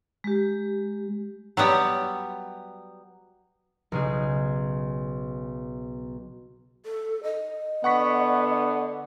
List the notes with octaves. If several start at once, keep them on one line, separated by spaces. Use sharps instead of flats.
G#3 G4
F#3 G3 B3 G4
B1 C#3 G#4
A4
D#5
D3 B3 F#5 C#6 B6